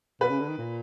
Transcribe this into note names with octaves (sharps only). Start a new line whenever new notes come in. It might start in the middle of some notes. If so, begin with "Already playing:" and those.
B2 B4
C#3
D3
D#3
A#2